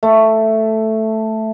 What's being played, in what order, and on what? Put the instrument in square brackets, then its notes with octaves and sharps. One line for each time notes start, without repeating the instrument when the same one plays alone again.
[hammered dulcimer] A3